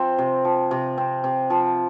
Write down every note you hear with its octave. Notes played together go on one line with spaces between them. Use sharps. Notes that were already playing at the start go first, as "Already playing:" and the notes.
Already playing: F3 C4
C3
F3
C3
C4
C3
F3